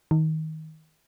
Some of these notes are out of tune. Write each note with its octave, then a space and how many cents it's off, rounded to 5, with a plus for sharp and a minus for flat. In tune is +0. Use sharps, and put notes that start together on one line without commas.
D#3 +20